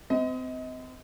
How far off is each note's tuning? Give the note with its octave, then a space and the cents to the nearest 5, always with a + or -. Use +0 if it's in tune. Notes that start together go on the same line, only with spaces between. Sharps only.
C4 -35 D#5 +30